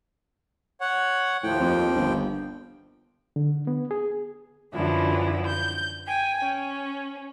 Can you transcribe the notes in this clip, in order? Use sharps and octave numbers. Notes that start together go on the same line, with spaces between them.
C#5 F#5
D#2 A2 F3 G5
F2
G1
D3
B3
G#4
F#2 D3 E3 F3 E4
G6
G5 G#5
C#4